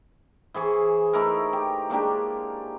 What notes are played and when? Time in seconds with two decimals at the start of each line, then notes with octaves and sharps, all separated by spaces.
0.54 E3 G#4 C5 C#6
1.13 A3 D#4 E4 A#4
1.53 G4
1.90 G#3 A#3 D4 G4